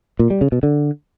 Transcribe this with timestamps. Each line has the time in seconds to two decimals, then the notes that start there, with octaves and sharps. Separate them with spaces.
0.19 A#2
0.30 G3
0.41 C#3
0.52 B2
0.63 D3